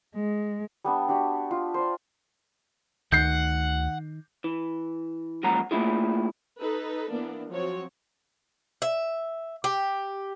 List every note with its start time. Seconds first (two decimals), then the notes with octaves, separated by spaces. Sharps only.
0.14 G#3
0.84 G3 B3 D4
1.08 D4 F#4 G4 B5
1.51 F4
1.74 C5 D5
3.12 D2 D#3 F#5 G6 C7
4.44 E3
5.43 F#2 A#2 F3 G#3 F#5 A#5
5.71 A3 A#3 D4 E4 F4 G#4
6.60 D#4 A4 B4
7.11 E3 A#3 B3 D4
7.51 F3 F#3 C4 F#4 C#5
8.82 E5
9.64 G4